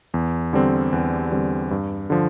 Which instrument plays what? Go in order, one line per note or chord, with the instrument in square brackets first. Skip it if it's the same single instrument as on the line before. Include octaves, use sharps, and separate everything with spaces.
[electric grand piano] E2
D3 G3 C4
E2
D3 G3 C4
G2
D3 F3